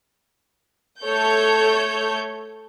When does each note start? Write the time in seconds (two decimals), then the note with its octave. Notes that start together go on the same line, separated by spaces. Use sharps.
1.03 A3 A4 C#5 G6